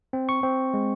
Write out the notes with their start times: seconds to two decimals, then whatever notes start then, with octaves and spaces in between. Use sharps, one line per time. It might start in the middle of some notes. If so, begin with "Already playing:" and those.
0.13 C4
0.29 C#6
0.43 C4
0.74 G#3